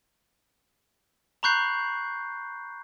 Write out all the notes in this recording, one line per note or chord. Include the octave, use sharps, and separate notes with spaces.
A#5 B5 C#6 F#6 G6 C7